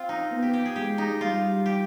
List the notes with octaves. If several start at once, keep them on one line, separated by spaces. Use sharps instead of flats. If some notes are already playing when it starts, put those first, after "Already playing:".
Already playing: C4 F4
D#4
B3
G4
G4
G#4
G#3 G4
D#4
G3 F4
G4